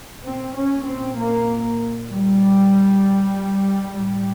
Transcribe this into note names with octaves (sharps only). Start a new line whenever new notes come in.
A#2 C4
C#4
C4
A#3
G3
A2 G3